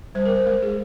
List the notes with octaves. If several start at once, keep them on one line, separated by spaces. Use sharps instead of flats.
G3 C5
A#4
C5
G#3 A#4
G#4